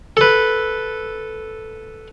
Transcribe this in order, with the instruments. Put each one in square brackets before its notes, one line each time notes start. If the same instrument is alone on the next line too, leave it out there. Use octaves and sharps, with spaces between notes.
[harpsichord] A4 B4